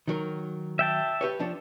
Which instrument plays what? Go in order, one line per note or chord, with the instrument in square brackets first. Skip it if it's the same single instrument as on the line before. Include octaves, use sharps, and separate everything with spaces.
[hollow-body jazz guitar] D#3 F#3 A#4
[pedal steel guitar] E5 G5 A5
[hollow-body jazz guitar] G4 B4 C#5
F3 D4 C#5